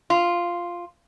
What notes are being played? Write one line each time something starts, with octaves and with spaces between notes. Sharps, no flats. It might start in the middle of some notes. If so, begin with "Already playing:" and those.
F4